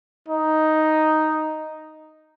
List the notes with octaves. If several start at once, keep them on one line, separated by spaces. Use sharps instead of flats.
D#4